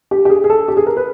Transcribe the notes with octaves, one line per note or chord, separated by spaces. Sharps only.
G4
G4
G#4
G#4
A4
G4
G#4
A#4
B4